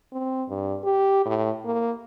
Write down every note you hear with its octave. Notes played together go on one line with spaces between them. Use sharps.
C4
G2
G4
A2
A#3